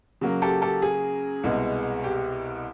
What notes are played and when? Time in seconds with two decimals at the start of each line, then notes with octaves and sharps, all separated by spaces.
0.21 C#3 F#3 A#3
0.42 G4 A4
0.62 G4 A4
0.82 G#4
1.44 C2 B2 G#3
2.04 G4